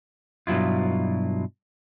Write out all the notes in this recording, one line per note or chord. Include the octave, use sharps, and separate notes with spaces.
G2 B2 F#3 E4 F4